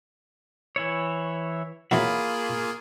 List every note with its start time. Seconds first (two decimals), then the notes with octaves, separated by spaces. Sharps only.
0.76 E3 E4 C#5
1.91 E3 F#3 A#3 F4 G#4 B5